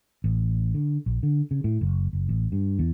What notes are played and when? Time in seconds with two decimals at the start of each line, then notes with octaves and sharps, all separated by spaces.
0.24 A1
0.74 D3
1.06 A#1
1.23 D3
1.51 C#3
1.64 A2
1.81 F#1
2.13 F#1
2.29 A1
2.52 G2
2.79 E2